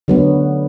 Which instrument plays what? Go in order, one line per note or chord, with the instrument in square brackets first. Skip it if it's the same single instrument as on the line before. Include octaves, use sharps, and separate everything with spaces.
[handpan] D3 F#3 B3